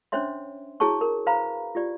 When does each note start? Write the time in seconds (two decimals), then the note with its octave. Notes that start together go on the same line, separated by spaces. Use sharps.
0.12 C#4 D4 C5 C#5 E5 C6
0.80 E4 F#4 G#4 C#5 A5 C#6
1.01 A#4
1.26 B4 C5 F5 A#5 B5
1.75 F4 G4 D5